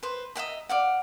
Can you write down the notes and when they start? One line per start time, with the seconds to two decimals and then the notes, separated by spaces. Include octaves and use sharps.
0.03 B4 C5
0.35 D#5 E5 F#5 A#5
0.69 D5 F5 F#5